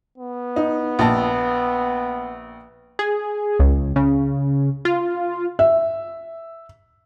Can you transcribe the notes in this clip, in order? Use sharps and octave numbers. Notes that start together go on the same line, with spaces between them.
B3
D#4
A#1 A5
G#4
C#2
C#3
F4
E5